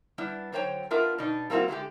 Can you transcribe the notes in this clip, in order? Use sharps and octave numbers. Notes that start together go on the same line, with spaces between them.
G3 B3 D4 E4
D3 F#3 C5 C#5 F#5 G5
B3 D4 F4 A#4 E5
B2 D4 D#4
G3 A#3 C4 E4 F#4
D3 G#3 A3 G4